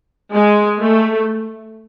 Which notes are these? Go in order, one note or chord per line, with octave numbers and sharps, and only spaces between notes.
G#3
A3